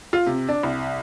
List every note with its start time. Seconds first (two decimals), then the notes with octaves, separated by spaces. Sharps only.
0.13 F4
0.27 C3
0.49 D4
0.63 C2